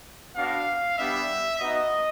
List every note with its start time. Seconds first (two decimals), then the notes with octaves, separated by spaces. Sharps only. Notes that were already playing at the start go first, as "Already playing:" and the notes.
0.35 B3 D4 F#4 F5
0.98 G3 B3 D4 G4 E5
1.60 B3 D#4 F#4 D#5